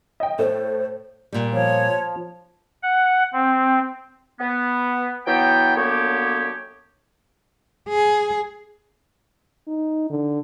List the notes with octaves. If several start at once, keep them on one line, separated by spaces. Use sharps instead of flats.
D#5 G5
A2 A3 C5
A#2 G3
F3 C#5
F#5
C4
B3
E3 F#3 B3 G5
F#2 D3 A#3 B3 G4 C#5
G#4
D#4
D3